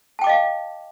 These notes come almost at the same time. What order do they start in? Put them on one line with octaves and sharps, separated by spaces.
A5 G5 D6 D#5 F5